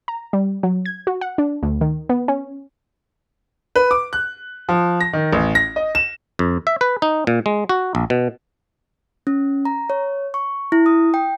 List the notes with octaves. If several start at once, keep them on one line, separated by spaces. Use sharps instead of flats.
A#5
G3
F#3
G#6
F#4
F#5
D4
D2
D#3
B3
C#4
B4
D6
F#6
F3
A#6
D#3
A1
A#6
D#5
E7
F2
E5
B4
D#4
A#2
G#3
F#4
A#1
B2
C#4
A#5
C#5
C#6
E4
D#6
G5